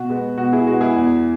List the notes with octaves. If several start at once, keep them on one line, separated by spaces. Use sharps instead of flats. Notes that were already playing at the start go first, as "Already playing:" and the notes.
Already playing: B2 F#4
G#3 B3
B2 F#4
E4 G#4
G#3 B3 F#4
E4 G#4
E2